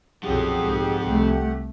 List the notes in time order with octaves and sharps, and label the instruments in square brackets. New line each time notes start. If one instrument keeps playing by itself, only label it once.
[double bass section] B1 F#2 A#2 [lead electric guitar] F3 C4 [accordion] G4 F#5 [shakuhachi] G#4
[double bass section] B1 G#2
C2 A3